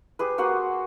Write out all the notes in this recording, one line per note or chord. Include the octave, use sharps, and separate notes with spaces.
G4 G#4 B4
A#3 F#4 C5 F#5